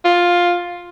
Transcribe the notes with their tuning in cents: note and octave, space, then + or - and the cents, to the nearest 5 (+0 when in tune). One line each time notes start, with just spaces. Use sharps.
F4 +10